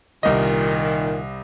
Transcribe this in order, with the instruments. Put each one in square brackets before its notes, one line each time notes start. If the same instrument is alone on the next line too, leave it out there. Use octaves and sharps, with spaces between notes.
[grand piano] C2 D#5 [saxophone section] A#2 D#3